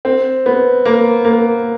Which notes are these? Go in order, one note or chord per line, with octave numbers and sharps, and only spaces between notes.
C4
B3
A#3
A#3